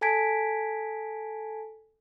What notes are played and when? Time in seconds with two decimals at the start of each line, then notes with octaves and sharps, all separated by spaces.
0.01 A4 G#5 A5 G#6 B6 D7